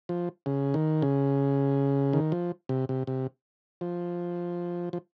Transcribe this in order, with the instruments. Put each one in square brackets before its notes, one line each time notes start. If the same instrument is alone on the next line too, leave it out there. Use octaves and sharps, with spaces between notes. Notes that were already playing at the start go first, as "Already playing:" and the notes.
[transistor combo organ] F3
C#3
D#3
C#3
D#3
F3
C3
C3
C3
F3
F3